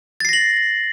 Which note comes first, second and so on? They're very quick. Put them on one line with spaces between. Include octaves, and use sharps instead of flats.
A6 C7 A#6 F#7